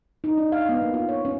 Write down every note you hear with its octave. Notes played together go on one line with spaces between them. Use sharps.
D#4
D4
F5
B3
A#3
F4
C#5
C#4